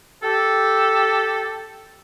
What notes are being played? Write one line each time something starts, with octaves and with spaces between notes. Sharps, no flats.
G4 A4